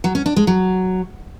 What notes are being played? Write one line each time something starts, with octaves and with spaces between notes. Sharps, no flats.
F#3
C#4
D4
G#3
F#3